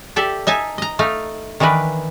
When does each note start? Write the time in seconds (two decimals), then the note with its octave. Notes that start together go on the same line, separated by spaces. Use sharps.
0.16 G4 A4 D5 E5
0.47 D#4 E5 G#5 A5
0.78 D#5 A#5
0.99 A3 D#4 F5
1.60 D#3 E3 D4 A#4 B4